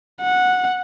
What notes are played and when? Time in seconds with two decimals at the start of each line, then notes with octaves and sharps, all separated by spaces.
0.21 F#5